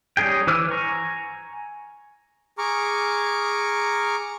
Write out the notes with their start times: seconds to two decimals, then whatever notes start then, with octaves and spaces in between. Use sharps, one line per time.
0.17 G3 C#4 D#4 G#4 G5
0.47 E3 B4 D6 E6 F6
0.71 G#5 A#5 C#6
2.58 G#4 A#5 C#6 D6 F6